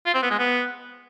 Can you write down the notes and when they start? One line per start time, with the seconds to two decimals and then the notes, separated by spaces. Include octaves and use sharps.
0.06 F4
0.14 C4
0.22 B3
0.31 G#3
0.39 B3